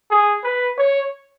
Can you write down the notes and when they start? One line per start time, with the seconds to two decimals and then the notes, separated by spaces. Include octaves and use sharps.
0.11 G#4
0.44 B4
0.78 C#5